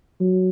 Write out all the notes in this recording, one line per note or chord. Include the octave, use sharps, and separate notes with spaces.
F#3